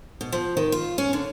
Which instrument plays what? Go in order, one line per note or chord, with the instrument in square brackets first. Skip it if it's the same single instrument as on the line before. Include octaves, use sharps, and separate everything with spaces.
[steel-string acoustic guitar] B2
F3
D#3
F4
C#4
D3